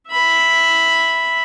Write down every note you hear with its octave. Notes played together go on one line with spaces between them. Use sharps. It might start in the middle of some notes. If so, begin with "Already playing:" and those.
E5 B5